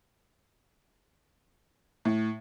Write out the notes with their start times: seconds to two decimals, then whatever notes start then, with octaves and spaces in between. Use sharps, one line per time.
2.05 A2